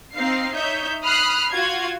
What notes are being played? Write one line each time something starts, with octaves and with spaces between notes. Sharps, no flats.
C4 D#4 F5 C7
D#4 C#5 E5 G6
B5 D#6 F6 F#6 C7
F4 F#4 G#6